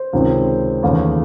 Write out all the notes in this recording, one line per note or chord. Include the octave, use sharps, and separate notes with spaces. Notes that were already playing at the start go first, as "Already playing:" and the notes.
Already playing: C5
C#2 C3 D#3 G#3 C4
D#2 C#3 E3 A3